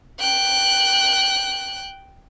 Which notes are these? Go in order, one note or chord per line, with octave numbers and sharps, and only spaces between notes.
G5 F#6